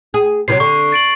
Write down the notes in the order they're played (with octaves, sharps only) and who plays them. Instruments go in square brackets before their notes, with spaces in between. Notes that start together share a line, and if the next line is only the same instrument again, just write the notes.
[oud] G#4
[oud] C3 F3 F#3 [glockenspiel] C7
[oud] D3 [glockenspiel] C#6
[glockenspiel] A6 D7 F#7